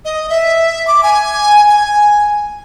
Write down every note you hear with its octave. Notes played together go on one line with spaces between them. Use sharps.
D#5
E5
D6
G#5
G#5